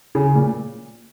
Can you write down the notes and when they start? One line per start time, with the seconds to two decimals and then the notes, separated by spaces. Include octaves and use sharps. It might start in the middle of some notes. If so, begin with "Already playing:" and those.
0.15 C#3
0.35 A#2